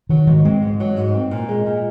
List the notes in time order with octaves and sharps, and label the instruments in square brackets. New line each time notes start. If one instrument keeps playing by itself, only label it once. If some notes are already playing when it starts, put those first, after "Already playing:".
[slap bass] D#3 [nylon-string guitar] F#3
[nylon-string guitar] G#2 [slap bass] D#3
[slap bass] G#3 [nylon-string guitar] C4
[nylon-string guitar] G#2
F#3
G#2
C4
A#2
G#3
A#2